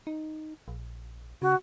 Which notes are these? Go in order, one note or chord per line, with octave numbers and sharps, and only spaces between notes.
D#4
A#1
C#3 F#4